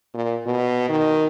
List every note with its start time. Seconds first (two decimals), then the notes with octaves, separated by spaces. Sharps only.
0.14 A#2
0.46 B2
0.89 D#3